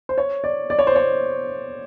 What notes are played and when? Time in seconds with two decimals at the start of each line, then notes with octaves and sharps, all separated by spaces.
0.09 C5
0.18 C#5
0.44 D5
0.70 D5
0.79 C#5
0.87 C5
0.96 C#5